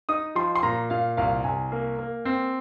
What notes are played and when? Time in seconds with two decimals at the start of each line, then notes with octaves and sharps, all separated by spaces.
0.09 D#4 D#6
0.35 F3 C6
0.55 C6
0.63 A#2 A#5
0.90 A#2 F5
1.17 C2 F5
1.44 C2 G#5
1.72 A#3
1.99 A#3
2.25 C4